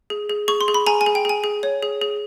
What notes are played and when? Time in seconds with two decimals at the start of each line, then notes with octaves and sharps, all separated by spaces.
0.10 G#4
0.30 G#4
0.48 G#4 C#6
0.61 C6
0.68 G#4
0.74 B5
0.86 G#4 G#5 A#5
1.01 G#5
1.06 G#4
1.15 G5
1.25 G#4 G#5
1.44 G#4
1.63 C#5
1.83 G#4
2.01 G#4